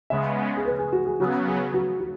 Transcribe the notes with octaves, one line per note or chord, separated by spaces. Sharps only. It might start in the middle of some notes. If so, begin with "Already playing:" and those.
C#3 G#3 B3 E5
G#4
B4
G#4
F#4
G#4
C#3 F#3 B3 F#4
G#4
F#4
F#4